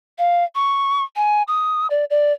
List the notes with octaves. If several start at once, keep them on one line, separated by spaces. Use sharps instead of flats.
F5
C#6
G#5
D#6
D5
D5